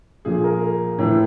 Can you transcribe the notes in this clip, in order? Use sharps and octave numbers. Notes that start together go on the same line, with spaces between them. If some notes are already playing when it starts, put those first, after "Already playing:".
A#2 F3 G#4
A#4
A2 E3